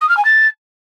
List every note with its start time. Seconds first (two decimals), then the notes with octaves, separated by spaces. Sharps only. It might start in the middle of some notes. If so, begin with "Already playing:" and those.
0.01 D#6
0.09 F6
0.17 G#5
0.25 A6